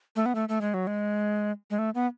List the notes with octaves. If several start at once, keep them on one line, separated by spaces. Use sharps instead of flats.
A3
B3
A3
A3
G#3
F#3
G#3
G#3
A3
B3